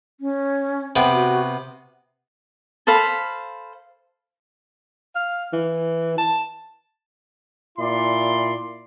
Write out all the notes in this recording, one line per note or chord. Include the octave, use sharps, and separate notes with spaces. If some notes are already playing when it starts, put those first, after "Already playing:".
C#4
C3 B3 G5
F#4
A4 C5 F5 B5
F5
E3
A5
A#2 E4 D5 C6